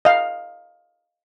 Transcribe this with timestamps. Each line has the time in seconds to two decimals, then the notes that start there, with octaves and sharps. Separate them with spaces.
0.05 D#5 F5